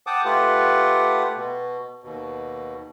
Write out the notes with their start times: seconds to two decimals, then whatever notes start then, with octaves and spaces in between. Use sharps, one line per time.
0.07 F#5 G5 A5 D6 D#6
0.25 A3 F4 G4 B4 F#5
1.36 B2
2.04 D#2 B2